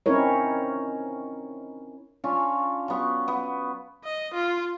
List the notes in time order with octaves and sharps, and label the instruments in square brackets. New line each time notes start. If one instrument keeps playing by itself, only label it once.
[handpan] C4 C#4 D#4 E4 A#4 C#5
[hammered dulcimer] C#4 D4 F4 C#5
F#3 B3 C#6
B3
[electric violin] D#5
F4